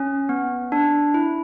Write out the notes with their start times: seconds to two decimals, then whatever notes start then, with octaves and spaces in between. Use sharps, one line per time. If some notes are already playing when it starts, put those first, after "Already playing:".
Already playing: C#4
0.29 B3
0.72 D4
1.14 E4